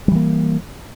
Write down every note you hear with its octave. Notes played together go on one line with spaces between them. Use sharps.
E3 G3 A#3